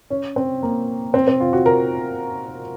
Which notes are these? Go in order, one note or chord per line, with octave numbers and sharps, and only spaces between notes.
C#4
C4
A#3
C4
C4
F4
F#4
A#4